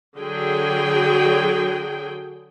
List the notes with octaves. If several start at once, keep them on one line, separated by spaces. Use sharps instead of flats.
D3 F#3 G#4 G5